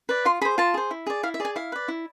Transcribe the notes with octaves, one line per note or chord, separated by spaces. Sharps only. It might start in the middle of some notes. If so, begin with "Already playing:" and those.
B4 D5
F4 C6
G#4 C5 B5
F4 A5
G#4 C5
E4
G#4 D5
E4 F5
E5
G#4 D5 G#5
E4 F5
B4 D5
E4